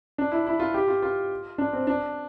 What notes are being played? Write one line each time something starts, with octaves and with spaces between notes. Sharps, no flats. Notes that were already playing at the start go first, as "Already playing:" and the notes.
D4
E4
E4
F4
G4
F4
F4
D4
C4
D4